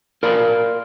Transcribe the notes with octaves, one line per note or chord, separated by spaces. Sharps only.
A#4 D5 F5 B5 C6